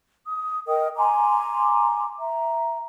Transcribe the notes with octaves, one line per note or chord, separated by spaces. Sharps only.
D#6
A#4 D#5 G5 D#6
G#5 A#5 C6 D6
E5 A#5